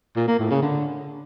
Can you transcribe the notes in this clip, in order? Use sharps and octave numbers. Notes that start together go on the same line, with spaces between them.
A#2
A#3
A2
C#3
D3